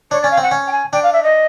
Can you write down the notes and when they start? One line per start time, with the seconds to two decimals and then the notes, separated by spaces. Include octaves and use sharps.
0.11 D4 C#5
0.21 D5
0.24 C#4
0.31 F5
0.37 C4 F#5
0.51 C#4
0.67 G5
0.71 G#5
0.92 D4 G5
1.03 F5
1.13 E5
1.23 D#5